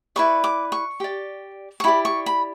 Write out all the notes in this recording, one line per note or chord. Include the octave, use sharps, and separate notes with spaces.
E4 B4 D5 C#6
D6
C#6
G4 D5
C#6
E4 G4 D5 B5
C#6
B5